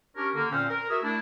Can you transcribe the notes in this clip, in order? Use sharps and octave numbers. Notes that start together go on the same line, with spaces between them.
C#4 D4 G4 A#4 C#5
D3 A#3
A#2 C4 C#4 C5 F5
A#4
F#4 G#4 A#4 E5 E6
A3 D4 E4